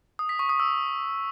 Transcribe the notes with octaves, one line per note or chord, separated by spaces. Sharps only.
D#6
B6
C#6
D#6
E6